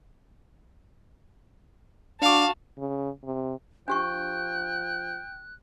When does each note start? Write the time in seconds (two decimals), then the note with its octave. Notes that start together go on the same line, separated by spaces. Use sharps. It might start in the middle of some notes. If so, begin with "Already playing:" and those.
2.22 D4 F#4 F5 A5 D6
2.78 C#3
3.24 C3
3.88 F3 D4 G4 G5 C#6 F#6